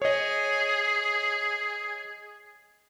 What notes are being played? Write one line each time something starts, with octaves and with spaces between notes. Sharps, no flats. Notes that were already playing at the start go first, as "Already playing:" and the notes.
G#4 C#5 D#5